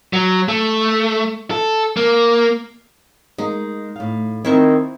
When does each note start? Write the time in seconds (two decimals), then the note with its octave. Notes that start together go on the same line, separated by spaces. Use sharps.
0.13 F#3
0.48 A3
1.51 A4
1.97 A#3
3.38 G#3 A#3 D#4
3.96 A2 F5
4.45 D#3 C4 E4 C5 C#6